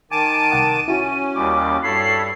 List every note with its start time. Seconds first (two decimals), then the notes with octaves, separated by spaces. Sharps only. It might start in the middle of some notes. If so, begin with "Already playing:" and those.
0.11 D#3 G#5 A5 D6 D#7
0.51 C2 F#5 D#6
0.88 C#4 E4 F#4
1.35 D#2 G3 D6
1.83 G2 A4 C#5 B5 C7